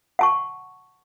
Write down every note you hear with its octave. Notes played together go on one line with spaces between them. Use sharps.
F#5 A5 C#6